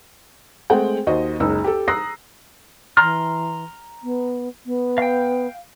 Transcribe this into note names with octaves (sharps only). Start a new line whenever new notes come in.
G#3 A3 C4 F#5 G5
D#2 F#4 C5 D#5
F#1 C#2 D#4 E6
G4 A4
A#5 D#6 E6 F#6 A#6 C7
E3 A#5 C6 F6
B3
B3
F5 G5